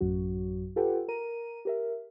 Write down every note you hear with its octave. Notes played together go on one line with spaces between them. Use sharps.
A1 F#2 F#3 F#4
F4 G4 A4 B4 F#5 G5
A#4 A#5 D#7
G4 A#4 E5